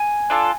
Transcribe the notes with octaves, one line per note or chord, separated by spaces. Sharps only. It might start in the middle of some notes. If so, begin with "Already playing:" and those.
Already playing: G#5
D4 F4 A4